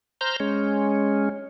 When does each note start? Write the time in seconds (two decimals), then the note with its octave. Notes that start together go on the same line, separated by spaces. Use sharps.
0.21 C5 A#5 F6 G6
0.40 G#3 C#4